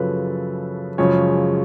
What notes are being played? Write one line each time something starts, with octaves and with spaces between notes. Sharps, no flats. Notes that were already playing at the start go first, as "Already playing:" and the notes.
Already playing: F#2 C#3 F3 A4 B4
F#2 C#3 F3 G#3 C#5